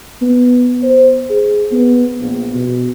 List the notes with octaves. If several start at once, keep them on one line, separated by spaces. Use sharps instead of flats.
B3
C5
G#4
B3
A#1
B2